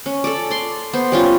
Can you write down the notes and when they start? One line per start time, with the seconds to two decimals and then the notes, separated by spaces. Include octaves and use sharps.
0.06 C#4
0.24 A4 D5
0.50 D5 C6
0.93 B3 C5
1.12 G3 C#4 F4